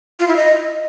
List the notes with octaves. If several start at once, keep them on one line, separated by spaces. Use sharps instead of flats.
F4
E4
D#5